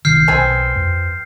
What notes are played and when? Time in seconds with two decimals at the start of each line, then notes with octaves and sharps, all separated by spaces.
0.05 A#1 C3 D#3 F6 G6 C7
0.28 B1 C4 B4 G#5
0.76 F2